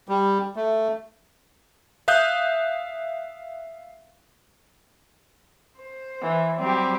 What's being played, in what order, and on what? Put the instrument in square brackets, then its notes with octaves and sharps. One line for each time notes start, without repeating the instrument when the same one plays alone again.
[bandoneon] G3
A3
[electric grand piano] E5 F5 D#6 F#6 G6
[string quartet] C5
[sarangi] E3
[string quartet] F#3 G3 G4 [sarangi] C4